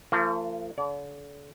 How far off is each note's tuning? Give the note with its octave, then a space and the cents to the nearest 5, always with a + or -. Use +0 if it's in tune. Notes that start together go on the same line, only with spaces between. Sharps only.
F3 -30 A3 +40
D3 -40 D5 -45